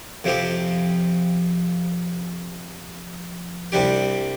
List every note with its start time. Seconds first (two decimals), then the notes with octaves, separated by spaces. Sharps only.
0.24 F2 C3 F3 C4 G4
3.72 C2 C3 G3 D4 G4